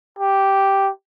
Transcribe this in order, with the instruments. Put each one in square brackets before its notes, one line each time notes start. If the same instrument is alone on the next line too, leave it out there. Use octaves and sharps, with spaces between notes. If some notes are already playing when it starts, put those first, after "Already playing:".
[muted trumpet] G4